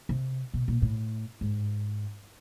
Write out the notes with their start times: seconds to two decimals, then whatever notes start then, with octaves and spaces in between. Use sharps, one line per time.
0.09 C3
0.54 B2
0.68 A#2
0.82 A2
1.41 G#2